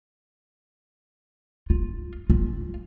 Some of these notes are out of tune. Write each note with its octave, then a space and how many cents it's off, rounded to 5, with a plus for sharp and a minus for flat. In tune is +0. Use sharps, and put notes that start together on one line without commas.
F4 +5
F4 +5